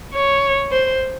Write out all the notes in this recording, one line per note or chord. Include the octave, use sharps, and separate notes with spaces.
C#5
C5